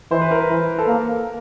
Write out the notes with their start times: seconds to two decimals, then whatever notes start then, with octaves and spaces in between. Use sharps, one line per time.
0.11 E3 C5
0.21 B4
0.31 A#4
0.40 B4
0.49 E3
0.79 A4
0.87 A#3 A#4